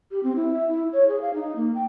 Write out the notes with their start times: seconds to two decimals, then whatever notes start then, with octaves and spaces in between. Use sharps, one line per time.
0.11 G4
0.23 C4
0.36 E4
0.53 E5
0.68 E4
0.93 C#5
1.08 G#4
1.21 F5
1.34 D#4
1.56 A#3
1.75 G5